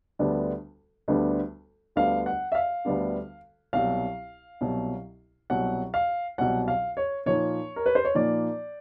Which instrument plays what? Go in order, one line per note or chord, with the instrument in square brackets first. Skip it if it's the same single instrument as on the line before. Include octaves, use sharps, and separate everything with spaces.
[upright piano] D2 D3 G3 B3 D4
D2 D3 G3 B3 D4
D2 D3 G3 B3 D4 F5
F#5
E5
F5
D2 D3 G3 B3 D4
C2 B2 F#3 F5
C2 B2 F#3
C2 B2 F#3 F#5
F5
C2 B2 F#3 F#5
F5
C#5
A#2 F3 A#3 D#4 C#5
A#4
B4
C5
C#5
A#2 F3 A#3 D#4 D5